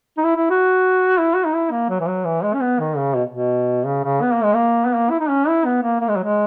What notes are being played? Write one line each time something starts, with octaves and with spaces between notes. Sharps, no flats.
D#4
E4
E4
F#4
E4
F#4
D#4
E4
A#3
F#3
E3
F#3
E3
G#3
C#4
B3
D#3
C#3
B2
B2
C#3
C#3
B3
A#3
G#3
A#3
B3
A#3
E4
D#4
C#4
E4
B3
A#3
A#3
G#3
F#3
G#3